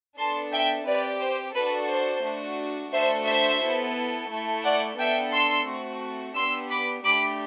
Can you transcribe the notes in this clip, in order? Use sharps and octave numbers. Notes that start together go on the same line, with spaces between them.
B3 D4 A4 A5 C6
E5 G5
C4 G4 B4 D5
C5
D4 F#4 A4 B4
C5
A3 D4 F#4
A3 D4 F#4 A4 C5 E5
C5 E5
B3 E4 A4
A3 E4 A4
D5 F#5
B3 D4 A4 E5 G5
C6 E6
A3 C4 F#4
B3 D4 G4 C6 E6
B5 D6
A3 D4 G4 B5 D6